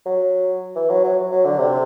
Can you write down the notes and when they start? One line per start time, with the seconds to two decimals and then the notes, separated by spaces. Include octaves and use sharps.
0.06 F#3
0.76 E3
0.89 F#3
1.04 F#3
1.31 F#3
1.45 D3
1.59 C3